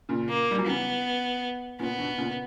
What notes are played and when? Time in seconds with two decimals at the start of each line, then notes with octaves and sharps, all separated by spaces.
0.09 A#2 C#3
0.29 A#3
0.51 G3
0.58 F#3
0.66 C#3 E3 B3
1.79 A#2 C#3 B3
1.98 B2 D3
2.18 A#2 C#3